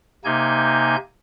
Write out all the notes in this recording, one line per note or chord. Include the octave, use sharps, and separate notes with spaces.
C3 A#3 D#4 G#5 G6